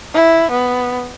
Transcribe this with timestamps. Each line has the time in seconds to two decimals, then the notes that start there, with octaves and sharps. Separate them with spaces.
0.14 E4
0.51 B3